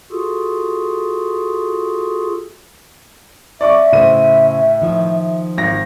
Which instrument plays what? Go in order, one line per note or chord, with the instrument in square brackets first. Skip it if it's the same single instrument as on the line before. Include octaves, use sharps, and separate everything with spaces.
[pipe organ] F4 F#4 G#4 A4
[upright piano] D5 C#6 D6 [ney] E5
[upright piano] A2 D#7 [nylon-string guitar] C#3 C5
[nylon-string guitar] D#3 F3
[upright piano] G#1 A#6